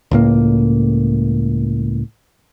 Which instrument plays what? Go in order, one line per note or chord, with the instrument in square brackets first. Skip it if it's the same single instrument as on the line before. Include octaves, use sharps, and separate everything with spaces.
[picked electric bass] C#2 A2 A#3